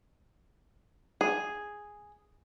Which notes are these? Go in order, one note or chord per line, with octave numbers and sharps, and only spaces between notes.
G#4